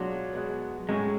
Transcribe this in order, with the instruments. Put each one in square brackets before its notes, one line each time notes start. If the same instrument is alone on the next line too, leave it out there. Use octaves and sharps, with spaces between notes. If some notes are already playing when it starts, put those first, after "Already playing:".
Already playing: [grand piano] B2 G#3 D4 F4 [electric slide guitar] F#3
[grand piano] B2 G#3 B3
[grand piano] A2 F#3 C#4 [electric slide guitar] G#3